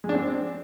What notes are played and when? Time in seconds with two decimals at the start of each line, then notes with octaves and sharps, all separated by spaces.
0.04 G#3
0.09 D4
0.14 C4